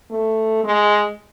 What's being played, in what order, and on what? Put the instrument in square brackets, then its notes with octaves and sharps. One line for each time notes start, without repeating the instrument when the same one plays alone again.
[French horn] A3
G#3